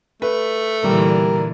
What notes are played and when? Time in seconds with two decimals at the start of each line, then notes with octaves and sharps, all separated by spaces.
0.22 A3 B4
0.84 A#2 D3 E3 G3 A#4